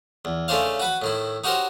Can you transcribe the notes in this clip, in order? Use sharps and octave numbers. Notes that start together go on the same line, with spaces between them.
E2
C#3 A3 C#4 D4 C5 F5
F#4 B4 B5
A2 D#3 E4
D#4 F#4 G4 A#4 C5 C#5